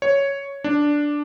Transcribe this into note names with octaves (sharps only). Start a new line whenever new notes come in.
C#5
D4